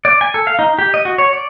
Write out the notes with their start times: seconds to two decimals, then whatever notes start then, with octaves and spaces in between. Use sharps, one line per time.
0.05 D5
0.21 G#5
0.34 A4
0.47 F5
0.59 D#4
0.79 G4
0.94 D#5
1.05 F#4
1.18 C#5
1.33 D5